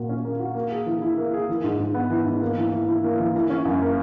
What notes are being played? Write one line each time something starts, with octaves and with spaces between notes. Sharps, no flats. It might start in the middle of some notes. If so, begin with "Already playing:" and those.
Already playing: A#2 A#3 F#4
C#4
A#3
F#4
A#3
G#4
E3
E4
A#3
G#4
E3
G#2
G#2
B3
E3
G#2
A#3
E3
E3
E4
A#3
E3
E3
C#4
F#2
A#3